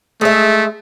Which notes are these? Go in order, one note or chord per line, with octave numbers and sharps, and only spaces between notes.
G#3 A3 E5